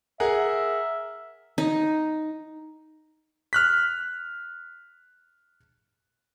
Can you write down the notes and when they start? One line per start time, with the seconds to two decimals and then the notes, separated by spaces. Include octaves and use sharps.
0.20 G#4 A#4 E5 F#5
1.58 D#4
3.53 F6 F#6 B6